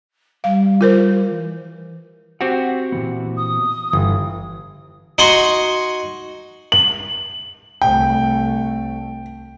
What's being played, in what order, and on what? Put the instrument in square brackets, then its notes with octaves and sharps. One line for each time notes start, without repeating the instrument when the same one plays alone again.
[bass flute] G3 [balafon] F5
[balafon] F4 A#4 C5
[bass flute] E3
[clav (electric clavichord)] C4 F#4 G4 [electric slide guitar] F#5
[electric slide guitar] A#2 E3 B3
[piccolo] D#6
[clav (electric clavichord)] G1 [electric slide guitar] E3
[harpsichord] D#4 F#4 F#5 G#5 C6
[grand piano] F#7
[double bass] C2 A3 [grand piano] G5